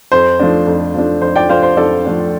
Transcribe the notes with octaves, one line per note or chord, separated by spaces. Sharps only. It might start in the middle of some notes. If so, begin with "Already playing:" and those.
F2 C5
F3 A3 D4
F2
F3 A3 D4
F2 C5
D5 G5
F3 A3 D4 C5 F5
C5
F2 A4 D5
F3 A3 D4